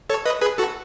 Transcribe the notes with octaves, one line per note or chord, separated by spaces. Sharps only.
A4 C#5
B4 D#5
G#4 B4
F#4 A4